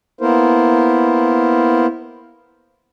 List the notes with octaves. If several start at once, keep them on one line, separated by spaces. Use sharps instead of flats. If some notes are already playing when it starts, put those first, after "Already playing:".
A#3 B3 E4 A#4 C5